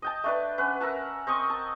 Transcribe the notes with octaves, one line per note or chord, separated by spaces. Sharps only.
D#5 G5 A5
A3 D4 B4
C#4 B4 F#5
A#4 E5 F#5 A5
C4 D#5 C#6 D#6
A5